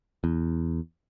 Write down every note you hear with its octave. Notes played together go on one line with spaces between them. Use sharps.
E2